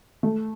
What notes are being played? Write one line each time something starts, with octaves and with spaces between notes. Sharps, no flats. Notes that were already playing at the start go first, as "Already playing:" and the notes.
A3